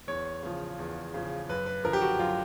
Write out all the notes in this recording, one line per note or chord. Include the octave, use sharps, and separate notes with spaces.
E2 C#5
C#3 F3
E2
C#3 F3
F#2 B4
B4
D3 F3 A#4
G4
F#4
F#2 F4